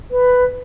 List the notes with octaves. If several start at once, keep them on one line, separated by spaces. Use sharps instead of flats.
B4